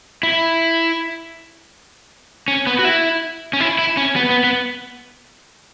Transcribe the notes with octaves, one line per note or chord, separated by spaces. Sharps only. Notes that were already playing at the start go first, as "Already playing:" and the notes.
E4
C#4
B3
F#4
E4
C#4
E4
E4
C#4
B3
B3
B3